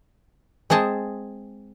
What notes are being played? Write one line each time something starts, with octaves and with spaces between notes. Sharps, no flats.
G#3 C4 G#4 A5